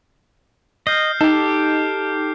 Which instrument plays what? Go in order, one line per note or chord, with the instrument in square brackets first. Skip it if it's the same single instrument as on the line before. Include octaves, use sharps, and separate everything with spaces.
[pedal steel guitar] D#5 [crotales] F6 G6 C7
[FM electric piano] D#4 [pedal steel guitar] G4 A4